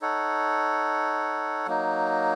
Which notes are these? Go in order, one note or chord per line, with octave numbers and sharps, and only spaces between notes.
D#4 A4 C#5 F#5
F#3 A#3 D#4